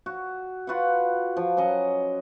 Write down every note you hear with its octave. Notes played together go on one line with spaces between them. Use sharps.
F#4
F4 F#4 B4 F#5
F3
F#3 C#4 D#5